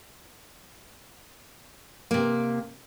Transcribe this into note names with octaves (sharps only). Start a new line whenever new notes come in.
C3 A#3